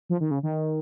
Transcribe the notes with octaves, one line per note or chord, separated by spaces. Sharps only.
F3
D#3
C#3
D#3